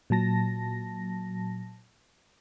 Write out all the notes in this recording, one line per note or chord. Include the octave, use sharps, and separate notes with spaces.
A#2 F#3 A5 A#6